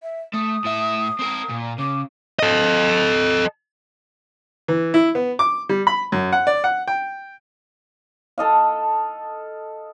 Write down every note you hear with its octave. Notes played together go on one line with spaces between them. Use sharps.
E5
A3 D#6
A2 E5
C4 A#4
A#2
C#3 D6
A4 D#5
E3
E4
B3
D6
G3
B5
F#2
F#5
D5
F#5
G5
A4 D#5 F5